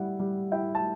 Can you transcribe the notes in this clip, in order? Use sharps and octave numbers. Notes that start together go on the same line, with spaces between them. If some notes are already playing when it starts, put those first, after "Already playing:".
Already playing: G3 E4 F#5
G3
E4 G5
A5